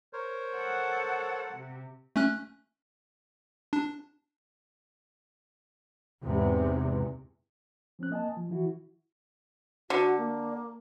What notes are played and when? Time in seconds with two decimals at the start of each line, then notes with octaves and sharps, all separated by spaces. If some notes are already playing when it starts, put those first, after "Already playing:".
0.13 A#4 C5 C#5
0.53 A4 F#5
1.54 C3
2.16 A3 C#4 F#6
3.73 D4
6.23 E2 G#2 C3
7.99 F3 C4 C#4 F#6
8.11 A#3 D#5 G#5 A5
8.37 F3
8.50 E3 E4 F#4
9.90 D3 F#4
10.18 A#3